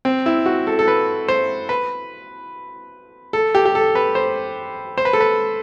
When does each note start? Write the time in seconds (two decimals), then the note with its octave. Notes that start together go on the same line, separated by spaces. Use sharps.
0.05 C4
0.26 E4
0.46 F#4
0.67 A4
0.79 A4
0.88 B4
1.28 C5
1.69 B4
3.33 A4
3.55 G4
3.65 G4
3.75 A4
3.95 B4
4.15 C5
4.98 C5
5.05 B4
5.13 A4
5.21 B4